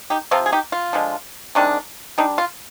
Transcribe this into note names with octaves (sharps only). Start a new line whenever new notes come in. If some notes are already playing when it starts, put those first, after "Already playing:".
D#4 G4
C3 F3 C4 F4
G#4
D#4 G4
F4
D3 F3 G#3
C3 D#3 G#3 D4
G3 D4 D#4
F4